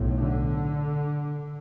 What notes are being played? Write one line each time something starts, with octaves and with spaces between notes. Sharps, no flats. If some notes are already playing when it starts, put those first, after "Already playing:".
Already playing: B1 A2
D3